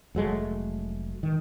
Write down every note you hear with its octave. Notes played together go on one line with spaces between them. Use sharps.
F1 F#3 G#3 A3
D#3